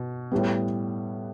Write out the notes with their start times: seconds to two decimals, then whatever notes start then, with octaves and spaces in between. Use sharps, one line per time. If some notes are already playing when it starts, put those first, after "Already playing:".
Already playing: B2
0.32 A2 G3 B3